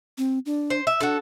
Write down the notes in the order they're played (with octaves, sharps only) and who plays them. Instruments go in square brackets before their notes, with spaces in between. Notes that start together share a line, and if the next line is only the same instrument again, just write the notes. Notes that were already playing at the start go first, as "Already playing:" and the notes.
[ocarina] C4
D4
[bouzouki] C5
E5
[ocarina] D4 [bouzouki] F#4 A4